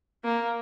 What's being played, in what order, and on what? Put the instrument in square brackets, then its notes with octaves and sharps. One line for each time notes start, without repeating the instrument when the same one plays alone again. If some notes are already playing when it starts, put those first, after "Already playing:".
[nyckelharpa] A#3